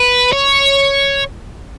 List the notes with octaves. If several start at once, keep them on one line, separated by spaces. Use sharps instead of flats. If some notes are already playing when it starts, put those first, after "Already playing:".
Already playing: B4
C#5